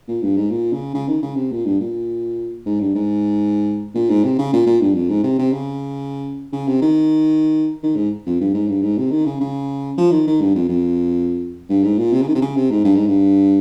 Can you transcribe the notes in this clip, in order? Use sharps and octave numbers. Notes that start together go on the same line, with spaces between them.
A#2
G2
G#2
A#2
C#3
C#3
D#3
C#3
C3
A#2
G2
A#2
G#2
G2
G#2
A#2
G#2
C3
C#3
A#2
A#2
G2
F2
G#2
C3
C3
C#3
C#3
C3
D#3
D#3
G#2
F2
G2
G#2
G2
G#2
C3
D#3
C#3
C#3
F3
D#3
D#3
G2
F2
F2
G2
G#2
A#2
C3
C#3
D#3
C3
C#3
C3
G#2
G2
G#2
G2